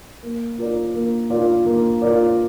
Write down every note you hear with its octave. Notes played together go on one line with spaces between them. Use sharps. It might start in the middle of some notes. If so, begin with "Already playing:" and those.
A#3
F4 A#4 D5
A#3
F4 A#4 D5
A#3
F4 A#4 D5